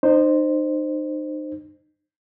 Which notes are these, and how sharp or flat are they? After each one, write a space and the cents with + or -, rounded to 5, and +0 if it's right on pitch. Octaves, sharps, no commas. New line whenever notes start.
D#4 -35 C5 +0